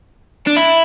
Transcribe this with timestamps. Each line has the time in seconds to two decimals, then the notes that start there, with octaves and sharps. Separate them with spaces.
0.47 D4
0.57 E4